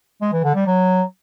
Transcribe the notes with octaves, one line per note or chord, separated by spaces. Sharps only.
G#3
E3
D3
G3
F#3